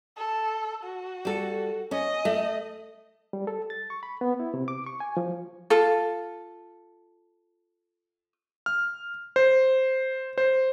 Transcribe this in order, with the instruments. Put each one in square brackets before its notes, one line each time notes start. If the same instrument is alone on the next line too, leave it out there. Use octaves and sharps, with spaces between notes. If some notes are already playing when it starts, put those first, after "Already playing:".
[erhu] A4
F#4
[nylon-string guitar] G3 A4
[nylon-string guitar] C#4 [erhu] D#5
[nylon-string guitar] A3
[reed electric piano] G3
A4
A6
C#6
B5
B3
E4
C3
D6
C#6
G#5
F3
[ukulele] F4 A4
[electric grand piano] F6
C5
C5